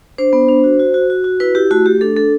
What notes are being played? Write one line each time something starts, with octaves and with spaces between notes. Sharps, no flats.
D4 C5
B3
D4
F#4
F#4
F#4
F#4
F#4
E4 B4
E4 G4
A3 F#4
A3 G4
D4 A4
D4 A4